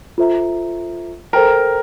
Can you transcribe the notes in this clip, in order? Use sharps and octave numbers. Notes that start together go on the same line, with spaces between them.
F4 A4 C5 E5 A#5
A4 A#4 C5 G5 A#5